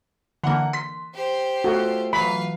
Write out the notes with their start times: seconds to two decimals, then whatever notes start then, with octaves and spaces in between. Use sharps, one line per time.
0.44 D3 E3 A#3 F#5 A#5
0.73 C6 B6
1.14 G4 C5
1.64 A3 F4 F#4
2.13 E3 F#3 B4 F5 B5